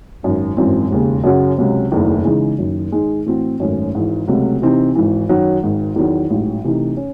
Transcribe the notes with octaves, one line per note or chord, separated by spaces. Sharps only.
G#1 F#2 D#3
G#1 F#2 E3 C4
E1 D#2 C#3
F#2 C#3 F#3 C#4 F#4
C#2 C3 F#3 C#4
F#1 E2 D#3 A3
C#3 E3 G#3 D#4
F#1 F#2 D#3
G#2 D#3 G#3 D#4
A2 E3 C4 F#4
G#1 F#2 D#3 A3 C#4
G#1 G#2 E3
C#2 C3 F#3 A3 C4
C3 E3 C4 D#4
G#1 G#2 E3
F#2 D#3 F#3
G#1 G#2 D#3
E2 D#3 F#3
A1 G#2 F#3
C3 E3 A3 D#4
C#4